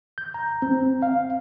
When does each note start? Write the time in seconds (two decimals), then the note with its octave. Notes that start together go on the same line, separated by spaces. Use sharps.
0.18 G6
0.34 A#5
0.62 C4
1.02 F5